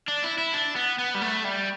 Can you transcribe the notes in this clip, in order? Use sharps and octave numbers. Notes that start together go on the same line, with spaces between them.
D4
E4
E4
D4
B3
B3
G3
A3
G3